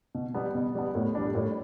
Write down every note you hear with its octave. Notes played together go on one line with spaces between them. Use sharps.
B2
G3 B3
B2
G3 B3
A2
G3 D4
A2